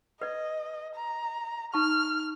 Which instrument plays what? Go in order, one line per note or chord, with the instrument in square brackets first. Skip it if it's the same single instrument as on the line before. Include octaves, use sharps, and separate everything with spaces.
[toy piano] B4 D5 [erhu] D#5
[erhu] A#5
[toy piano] D#4 A5 C#6 [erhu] F6